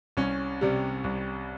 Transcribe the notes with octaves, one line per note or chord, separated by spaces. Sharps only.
C2 C#4
C3 G3
C2